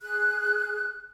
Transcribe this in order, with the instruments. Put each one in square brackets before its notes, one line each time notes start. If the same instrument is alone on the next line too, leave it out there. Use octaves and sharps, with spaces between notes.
[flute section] G#4 F#6